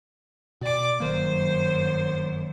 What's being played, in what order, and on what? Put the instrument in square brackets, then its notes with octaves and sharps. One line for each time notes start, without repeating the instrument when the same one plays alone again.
[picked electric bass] B2 [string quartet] D5 D6
[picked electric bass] G1 D#3 A#3 [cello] F#2 [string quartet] C5